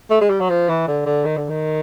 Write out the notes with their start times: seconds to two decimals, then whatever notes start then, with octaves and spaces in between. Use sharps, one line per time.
0.10 A3
0.21 G#3
0.30 G3
0.41 F#3
0.50 F3
0.69 E3
0.88 D3
1.06 D3
1.25 D#3
1.37 D3
1.49 D#3